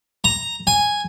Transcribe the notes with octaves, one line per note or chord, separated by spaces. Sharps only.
A#5
G#5